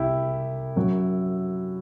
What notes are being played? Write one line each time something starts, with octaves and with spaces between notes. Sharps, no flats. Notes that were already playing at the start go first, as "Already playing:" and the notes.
Already playing: C2 E4 G4
F#2 F#3